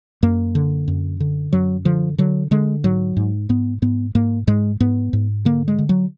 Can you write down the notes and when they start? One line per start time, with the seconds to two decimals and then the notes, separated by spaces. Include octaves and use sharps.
0.23 F#2 A#3
0.55 D3
0.88 F#2
1.20 D3
1.53 F#2 F#3
1.85 D3 F3
2.18 D3 F#3
2.51 D3 G#3
2.84 G#2 F#3
3.17 G#2
3.49 G#2 B3
3.82 G#2 B3
4.15 G#2 A#3
4.47 G#2 G#3
4.80 G#2 B3
5.13 G#2
5.45 D3 A#3
5.68 G#3
5.78 D3
5.89 F#3